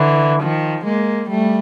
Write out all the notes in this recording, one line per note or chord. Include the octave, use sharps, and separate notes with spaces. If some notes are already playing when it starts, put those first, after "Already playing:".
Already playing: D3 E3
D#3 F3
G#3 A#3
G3 A3